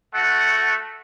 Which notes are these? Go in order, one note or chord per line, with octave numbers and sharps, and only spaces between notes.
A3 F#4 F#5